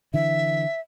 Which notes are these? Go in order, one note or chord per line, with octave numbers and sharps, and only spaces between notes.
D3 E3 E5